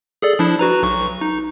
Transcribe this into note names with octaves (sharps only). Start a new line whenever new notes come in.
G#4 A4 D5
F3 D4 E4
F#4 B4 A#5
B1 C#6
D#4